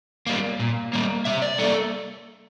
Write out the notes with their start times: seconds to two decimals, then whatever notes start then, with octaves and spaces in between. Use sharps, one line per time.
0.27 G3 A#3
0.60 A#2
0.93 G3 A#3
1.25 C3 E5
1.42 D5
1.58 G3 A#3 A4